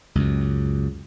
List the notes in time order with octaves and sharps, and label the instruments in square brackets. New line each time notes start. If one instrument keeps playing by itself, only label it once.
[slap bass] C#2 F#2